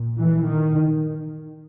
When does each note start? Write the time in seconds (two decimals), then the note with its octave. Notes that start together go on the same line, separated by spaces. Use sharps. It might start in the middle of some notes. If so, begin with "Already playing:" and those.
Already playing: A#2
0.19 E3
0.48 D#3